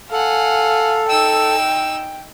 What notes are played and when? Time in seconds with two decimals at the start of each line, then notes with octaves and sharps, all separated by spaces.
0.12 A4 F5 F#5 G#5
1.10 D#4 G5 E6